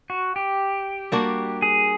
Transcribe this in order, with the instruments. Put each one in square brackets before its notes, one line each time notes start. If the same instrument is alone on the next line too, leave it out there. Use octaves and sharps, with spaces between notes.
[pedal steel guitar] F#4
G4
[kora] G3 A#3 D4 F#4
[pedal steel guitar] G#4